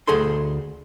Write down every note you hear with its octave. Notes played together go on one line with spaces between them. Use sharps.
D2 G#4 A4 C6